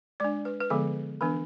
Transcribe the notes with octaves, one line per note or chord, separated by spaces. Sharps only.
G#3 D4 D5
B4
B4
D3 F3 G#3 B3 A4
E3 B3 D4 B4